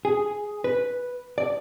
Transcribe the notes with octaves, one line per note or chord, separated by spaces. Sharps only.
G#4
B4
D5